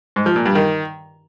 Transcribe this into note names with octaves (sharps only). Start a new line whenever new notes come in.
G#2
F3
A#2
G2
D#3